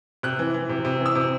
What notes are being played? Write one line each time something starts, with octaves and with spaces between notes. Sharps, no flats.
C3 F#6
E3
E3
C3
C3
E3
E6
C3